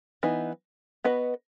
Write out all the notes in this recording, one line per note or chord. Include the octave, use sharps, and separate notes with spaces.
E3 B3 D#4
B3 F#4 B4 D#5